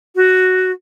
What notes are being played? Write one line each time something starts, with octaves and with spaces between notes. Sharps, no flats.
F#4